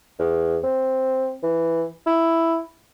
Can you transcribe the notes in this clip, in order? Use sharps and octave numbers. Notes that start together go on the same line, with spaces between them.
E2
C4
E3
E4